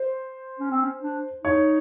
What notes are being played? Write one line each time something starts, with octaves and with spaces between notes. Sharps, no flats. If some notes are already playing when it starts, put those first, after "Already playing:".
Already playing: C5
C#4
C4
C#4
D4
D#4 C#5